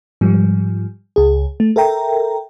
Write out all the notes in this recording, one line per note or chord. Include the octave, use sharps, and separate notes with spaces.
G#2 F3 G3
C#2 G#4
A3
A4 A#4 E5 G5 A#5